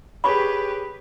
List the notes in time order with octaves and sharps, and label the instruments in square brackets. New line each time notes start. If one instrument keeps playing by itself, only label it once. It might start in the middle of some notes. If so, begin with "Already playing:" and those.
[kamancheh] G4 B4 [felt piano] G#4 C#5 [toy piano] B5 C#6